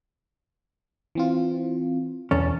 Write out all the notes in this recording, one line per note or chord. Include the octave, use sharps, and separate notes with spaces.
E3 C4 F4
B1 E2 C#4 A5